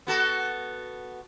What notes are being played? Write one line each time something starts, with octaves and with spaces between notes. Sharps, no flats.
B3 F#4 A4